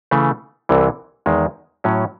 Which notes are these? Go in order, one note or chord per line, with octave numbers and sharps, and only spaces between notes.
C#3 E3 A3
C2 C3 E3
E2 D#3 G#3
A2 F#3 C#4